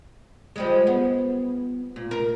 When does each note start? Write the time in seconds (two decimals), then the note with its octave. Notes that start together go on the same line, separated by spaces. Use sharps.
0.56 F3 G3 G#3
0.87 B3
1.96 A#2
2.11 A#4